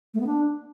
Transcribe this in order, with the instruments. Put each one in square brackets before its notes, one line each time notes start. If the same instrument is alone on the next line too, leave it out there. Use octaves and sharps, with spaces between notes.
[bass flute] A3
B3
D4